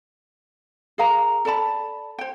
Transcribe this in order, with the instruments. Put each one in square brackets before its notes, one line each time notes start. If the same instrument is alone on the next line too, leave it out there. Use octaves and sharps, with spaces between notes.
[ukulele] G#4 A#4 F5 A#5
A4 D5 A5 B5
C5 G5